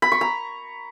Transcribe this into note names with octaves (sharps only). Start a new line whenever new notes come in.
B5
C#6
A#5